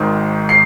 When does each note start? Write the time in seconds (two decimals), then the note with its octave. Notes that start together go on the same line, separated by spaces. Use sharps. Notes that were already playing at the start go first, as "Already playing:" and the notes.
Already playing: G#1 G#2 D#3
0.49 C7